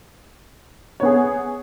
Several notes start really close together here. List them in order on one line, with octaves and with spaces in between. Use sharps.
C#5 B3 G#4